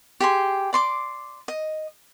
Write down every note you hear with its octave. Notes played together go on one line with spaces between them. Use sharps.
G4 G#4 C6
D5 C6 D6
D#5